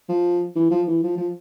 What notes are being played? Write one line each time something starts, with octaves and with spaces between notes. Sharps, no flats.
F3
E3
F3
E3
F3
F3